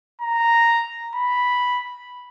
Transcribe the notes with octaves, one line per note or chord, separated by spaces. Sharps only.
A#5
B5